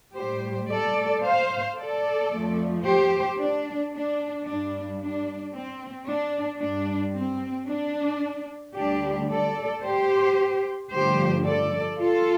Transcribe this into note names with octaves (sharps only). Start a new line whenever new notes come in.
A2 G3 G4 C5
A4 D5
C5 F5
A4 D5
F2 F3 A3
G4 C5
D4
D4
G2 G3 D4
D4
C4
D4
G2 G3 D4
C4
D4
D2 D3 G3 D4 G4
A4 D5
G4 C5
G2 D3 F3 A3 G4 C5
A4 D5
F4 A4